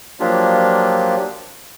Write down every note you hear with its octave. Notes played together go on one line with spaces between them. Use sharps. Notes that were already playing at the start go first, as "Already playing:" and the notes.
F3 F#3 A#3 D4 F4 G4